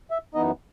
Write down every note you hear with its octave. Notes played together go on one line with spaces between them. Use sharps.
E5
F#2 E3 B3 D#4 D#5